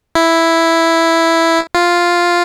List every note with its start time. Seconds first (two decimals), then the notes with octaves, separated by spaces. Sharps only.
0.15 E4
1.75 F4